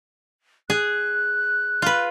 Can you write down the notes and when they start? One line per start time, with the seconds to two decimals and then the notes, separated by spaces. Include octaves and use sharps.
0.70 G#4 F#6
1.82 F4 B4